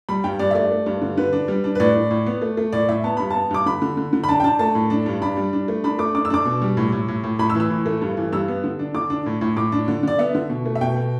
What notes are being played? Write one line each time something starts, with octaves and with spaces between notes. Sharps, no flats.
G3 B5
G2 G5
G2 D5
E5
A3 D5
A3
G2
D3
D3 B4
D4
G3
D4
B4
A2 D5
A2
A2
B3
A3
A3
A2 D5
A2 E5
B3 A5
G2 B5
B3 A5
G2 D6
D3 B5
D3
D3
D3
B5
D4 A5
G5
D4 A5
A3 A5
A2
D4
G2
D4 B5
G3
D4
A3
D4 B5
A3 D6
D4 D6
E6
D4 D6
B2
G3
A2
A2
A2
A2
A2 B5
E6
E3
E6
A2
A3
G2
E3
G2 E6
B3
D3
D4
D3 D6
D4
A2
A2
A2 D6
D4
D3
D3 D5
B3 E5
D3
B2
A3
E5
B2 G5
B2